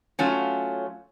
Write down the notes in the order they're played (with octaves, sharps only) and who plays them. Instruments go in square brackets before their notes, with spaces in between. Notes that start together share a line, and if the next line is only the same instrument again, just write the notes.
[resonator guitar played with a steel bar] F#3 A3 C#4 F4